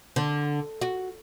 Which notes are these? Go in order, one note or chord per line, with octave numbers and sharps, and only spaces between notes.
D3
F#4